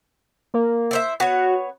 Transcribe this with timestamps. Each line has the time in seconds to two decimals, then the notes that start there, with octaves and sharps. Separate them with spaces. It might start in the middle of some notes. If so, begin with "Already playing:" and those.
0.54 A#3
0.91 E4 C5 E5
1.20 B3 F#4 C#5